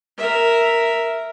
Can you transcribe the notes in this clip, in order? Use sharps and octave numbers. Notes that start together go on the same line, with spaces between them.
A#4 E5